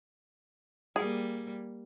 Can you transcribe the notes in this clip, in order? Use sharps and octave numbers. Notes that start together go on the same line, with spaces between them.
G3 A#3 G#4